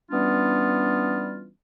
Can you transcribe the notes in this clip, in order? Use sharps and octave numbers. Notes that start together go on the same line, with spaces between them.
E3 G3 B3 C#4 D4 F4